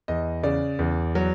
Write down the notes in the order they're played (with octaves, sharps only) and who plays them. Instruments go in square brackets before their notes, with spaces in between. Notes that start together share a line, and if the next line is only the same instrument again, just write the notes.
[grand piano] E2 D#5
C#3 D5
E2
F#3